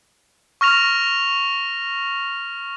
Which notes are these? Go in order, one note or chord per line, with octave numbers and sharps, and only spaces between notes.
C#6 F6 A#6 F7